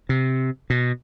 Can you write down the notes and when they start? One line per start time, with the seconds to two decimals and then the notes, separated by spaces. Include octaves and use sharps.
0.09 C3
0.70 B2